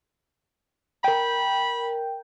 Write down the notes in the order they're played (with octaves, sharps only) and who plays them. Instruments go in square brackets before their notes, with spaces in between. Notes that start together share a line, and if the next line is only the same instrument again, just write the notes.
[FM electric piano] A#4 G5 [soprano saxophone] B5